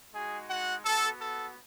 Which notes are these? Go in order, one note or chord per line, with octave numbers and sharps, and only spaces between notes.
G#3 D#4 F#4 G#4 G#5
F#4 F#5
B3 F#4 A4
A4